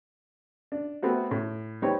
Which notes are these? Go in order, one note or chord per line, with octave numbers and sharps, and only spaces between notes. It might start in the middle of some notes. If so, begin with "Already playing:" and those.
D4
A3 B3 C4 F#4
A2
G3 C4 D#4 G4 B4 C#5